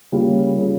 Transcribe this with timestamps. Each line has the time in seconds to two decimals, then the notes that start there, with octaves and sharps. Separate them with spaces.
0.12 C#3 G3 A#3 F4
0.59 C#3